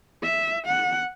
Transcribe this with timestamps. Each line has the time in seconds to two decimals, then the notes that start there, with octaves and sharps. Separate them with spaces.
0.23 E5
0.67 F#5